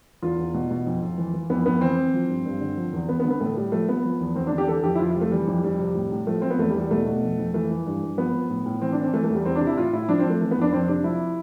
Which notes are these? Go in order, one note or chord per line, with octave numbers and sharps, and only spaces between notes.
E2 F4
E2
B2
B2
F2
F2
E3
E3
F2 B3
F2 B3
E3 C4
E3
F3
G2
G2
D3
F3
E2
E2 B3
B3
D3
B3
A2 A3
A2 G3
F3 A3
F3 B3
F3
E2
E2 C4
D4
D3
G4
E3 A4
F2 G4
E4
F2 F4
F4
C3
A3
E3 G3
F2 G3
F2 G3
C3
A2
A2
F3 A3
F3 C4
B3
E2 A3
G3
E2
G3
B2 A3
B2
F2
F2
E3 A3
E3
G2
G2
F3 B3
F3
A2
A2
E3 C4
D4
E3
C4
E3 A3
A3
E2 G3
E2 C4
D4
C3
E4
A2 F4
A2 E4
F3 D4
C4
F3 A3
E3 A3
B3
F2 D4
F2 C4
C3 D4
F3 E4